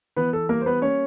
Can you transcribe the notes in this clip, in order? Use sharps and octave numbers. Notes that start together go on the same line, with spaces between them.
E3 B3 B4
A4
G3 A#3 A#4
C5
B3 B4
A#3 C#4 C#5